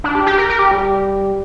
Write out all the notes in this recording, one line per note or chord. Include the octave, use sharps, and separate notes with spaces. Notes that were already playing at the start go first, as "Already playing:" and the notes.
D4
G4
G4
A#4
A#4
G4
G3